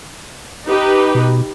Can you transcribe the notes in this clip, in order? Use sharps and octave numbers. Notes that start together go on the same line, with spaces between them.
D#4 G4 B4
B2